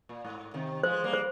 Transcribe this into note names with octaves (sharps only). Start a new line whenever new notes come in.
A#2
G#2
C3 D#3
F3 G#3 C5
G3 A#3
C5